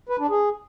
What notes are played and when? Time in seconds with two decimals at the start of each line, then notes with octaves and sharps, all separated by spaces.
0.09 B4
0.19 D4
0.30 G#4